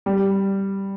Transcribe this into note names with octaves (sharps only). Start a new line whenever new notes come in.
G3